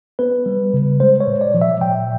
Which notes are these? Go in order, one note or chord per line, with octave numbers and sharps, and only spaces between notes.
B3 B4
G3
C#3
G#3 C5
C#5
A#2
D5
F3
E5
A#2 G5